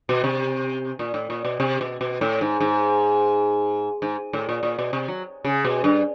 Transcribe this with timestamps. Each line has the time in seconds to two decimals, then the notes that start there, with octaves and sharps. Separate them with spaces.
0.09 B2
0.24 C3
0.99 A#2
1.14 A2
1.30 A#2
1.45 B2
1.60 C3
1.81 B2
2.01 B2
2.21 A2
2.41 G#2
2.60 G#2
4.02 G#2
4.33 A2
4.49 A#2
4.63 A#2
4.79 B2
4.93 C3
5.08 F#3
5.45 C#3
5.65 B2
5.84 G2